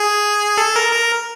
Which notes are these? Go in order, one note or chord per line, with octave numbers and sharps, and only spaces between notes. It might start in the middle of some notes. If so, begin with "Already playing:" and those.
Already playing: G#4
A4
A#4
A#4